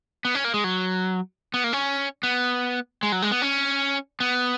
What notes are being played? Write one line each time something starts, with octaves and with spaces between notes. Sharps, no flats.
B3
C#4
A#3
G#3
F#3
B3
A#3
C#4
B3
G#3
F#3
G#3
B3
C#4
B3